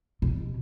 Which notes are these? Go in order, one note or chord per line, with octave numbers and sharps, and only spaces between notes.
B2